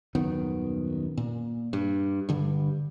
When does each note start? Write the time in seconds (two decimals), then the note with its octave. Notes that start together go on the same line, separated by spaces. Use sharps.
0.15 D#1 F#2 D#3 B3
1.17 A#2
1.73 G2
2.29 G2 D3 G3